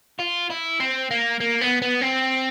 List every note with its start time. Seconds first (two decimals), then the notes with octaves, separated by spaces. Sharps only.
0.19 F4
0.50 E4
0.80 C4
1.11 A#3
1.40 A#3
1.61 B3
1.82 B3
2.01 C4